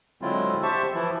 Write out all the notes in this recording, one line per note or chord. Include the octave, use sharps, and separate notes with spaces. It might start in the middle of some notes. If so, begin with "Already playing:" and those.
D3 F#3 G#3 C4 E4 F4
G4 C5 E5 A5 C#6
E3 F3 E4